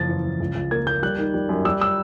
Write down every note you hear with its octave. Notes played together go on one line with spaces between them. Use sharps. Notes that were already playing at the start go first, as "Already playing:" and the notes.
Already playing: F#1 F3 A6
E2
F3
C#2
C#2
A#3 G#6
A#3 G6
G3 F#6
D#3
G3
F#2
G3 E6
E6